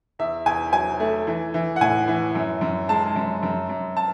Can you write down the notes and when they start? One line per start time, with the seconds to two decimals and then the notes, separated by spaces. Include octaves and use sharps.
0.19 E2 E5
0.46 E2 G#5
0.73 F#3 G#5
1.00 A3
1.27 E3
1.54 E3
1.76 F#5
1.81 A2 G#5
2.08 E3
2.35 F#2
2.61 F#2
2.89 G#3 A5
3.16 F#2
3.43 F#2
3.69 F#2
3.97 A5